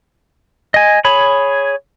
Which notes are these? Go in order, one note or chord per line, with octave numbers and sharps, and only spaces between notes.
D#5 G#5
G#4 C#5 B5